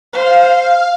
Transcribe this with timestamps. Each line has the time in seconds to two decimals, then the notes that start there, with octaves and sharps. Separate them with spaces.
0.13 C5 F5